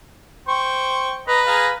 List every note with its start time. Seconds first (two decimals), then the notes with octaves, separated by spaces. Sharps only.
0.48 C5 G5 C#6
1.28 B4 D#5 A#5
1.46 G#4 F5 A#5